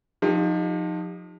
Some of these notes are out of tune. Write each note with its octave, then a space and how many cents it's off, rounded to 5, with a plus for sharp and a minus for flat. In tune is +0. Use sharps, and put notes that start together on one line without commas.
F3 +30 D#4 +0 G4 +30